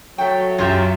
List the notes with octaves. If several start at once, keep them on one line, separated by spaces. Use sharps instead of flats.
F#3 A3 G5
F#2 F4 G4 E5